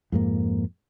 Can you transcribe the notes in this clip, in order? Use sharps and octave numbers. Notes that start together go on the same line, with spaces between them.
F2 G#2 A#3